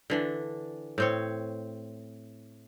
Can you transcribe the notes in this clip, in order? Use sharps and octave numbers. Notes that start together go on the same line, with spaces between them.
D3 E3 D4
A2 C4 C#5